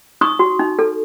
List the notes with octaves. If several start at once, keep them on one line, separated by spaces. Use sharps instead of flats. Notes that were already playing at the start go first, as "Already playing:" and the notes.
D#4 C#6 D#6
F#4
D#4
A4